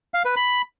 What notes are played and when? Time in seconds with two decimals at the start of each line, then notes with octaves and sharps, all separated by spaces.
0.14 F5
0.25 B4
0.36 B5